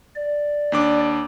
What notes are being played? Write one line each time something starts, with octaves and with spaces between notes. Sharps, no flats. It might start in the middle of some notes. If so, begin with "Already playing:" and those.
D5
D#2 D4 D6